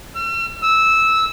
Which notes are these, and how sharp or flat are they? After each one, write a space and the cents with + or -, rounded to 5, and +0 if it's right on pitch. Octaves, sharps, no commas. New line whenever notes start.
E6 +45
E6 -15